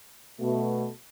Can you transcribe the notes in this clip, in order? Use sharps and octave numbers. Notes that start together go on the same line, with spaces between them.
B2 A3